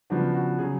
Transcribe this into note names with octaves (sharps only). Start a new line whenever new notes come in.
C#3 F3 B3 D4 F#4
F#4
C#3 F#3 G#4